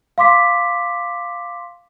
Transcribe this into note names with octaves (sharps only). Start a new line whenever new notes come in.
F5 C6 D6 B6